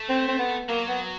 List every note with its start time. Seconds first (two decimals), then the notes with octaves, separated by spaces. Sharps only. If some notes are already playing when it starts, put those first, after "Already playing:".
Already playing: A3
0.09 C4
0.28 C4
0.39 B3
0.69 F#3 A#3
0.88 B3